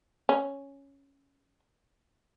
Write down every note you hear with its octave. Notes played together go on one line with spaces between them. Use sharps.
C#4